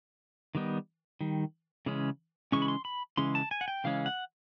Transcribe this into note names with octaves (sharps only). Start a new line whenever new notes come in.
D#3 G3 B3 D#4
D#3 G3
C#3 E3 G#3 C#4
C#3 E3 G#3 C#4 C#6
B5
C6
B5
C#3 E3 G#3 C#4 C6
A5
G#5
F#5
G5
C#3 E3 G#3 C#4 F5
F#5